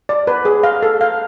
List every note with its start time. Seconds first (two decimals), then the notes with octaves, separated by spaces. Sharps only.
0.09 D5
0.27 B4
0.45 G#4
0.63 F5
0.83 A4
1.01 F5